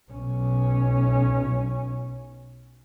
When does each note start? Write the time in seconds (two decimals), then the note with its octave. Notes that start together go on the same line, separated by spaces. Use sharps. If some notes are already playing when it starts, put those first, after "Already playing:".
0.12 B1 C#4